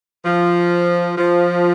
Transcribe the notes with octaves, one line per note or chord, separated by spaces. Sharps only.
F3
F3